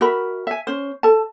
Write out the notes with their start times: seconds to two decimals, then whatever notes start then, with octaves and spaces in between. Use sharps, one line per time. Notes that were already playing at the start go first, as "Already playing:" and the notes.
0.01 F#4 A#4 E5 B5
0.47 E5 G#5
0.67 C#4 C5
1.03 A4 A5